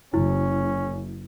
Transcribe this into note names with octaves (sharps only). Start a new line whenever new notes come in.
F#1 C#4 E4